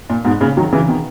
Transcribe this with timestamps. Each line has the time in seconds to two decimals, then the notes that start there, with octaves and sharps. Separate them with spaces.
0.10 A#2
0.25 G#2 B2
0.41 A#2 C#3
0.57 D#3 F#3
0.72 C#3 E3
0.88 B2 D#3